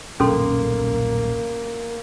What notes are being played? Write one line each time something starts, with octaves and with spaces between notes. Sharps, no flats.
D#1 B1 F#2 A#3 C#4 A4 C6